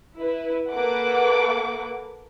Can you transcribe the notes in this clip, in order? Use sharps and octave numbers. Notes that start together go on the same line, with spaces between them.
E4 B4
A#3 A4 B4 F#5 D6